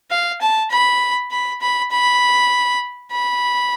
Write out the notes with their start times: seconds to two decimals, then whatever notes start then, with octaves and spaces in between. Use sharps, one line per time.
0.11 F5
0.41 A5
0.71 B5
1.32 B5
1.61 B5
1.91 B5
3.12 B5